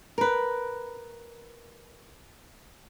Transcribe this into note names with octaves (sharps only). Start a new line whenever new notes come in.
A#4 B4